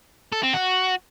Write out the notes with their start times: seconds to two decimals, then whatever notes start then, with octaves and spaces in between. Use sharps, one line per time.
0.32 A4
0.43 C4
0.54 F#4